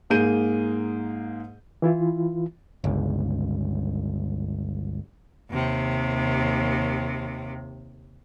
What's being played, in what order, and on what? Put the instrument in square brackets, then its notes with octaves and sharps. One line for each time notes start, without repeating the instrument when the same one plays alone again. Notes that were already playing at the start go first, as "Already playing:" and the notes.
[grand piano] G#2 A#3 G#4 G6 D#7
[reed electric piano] E3 E4 F4
[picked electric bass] G1 C#2
[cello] D#2 C3